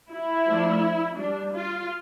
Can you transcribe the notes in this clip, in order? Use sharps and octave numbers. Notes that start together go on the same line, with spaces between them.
E4
F3 A3 D4
G3 D4
F4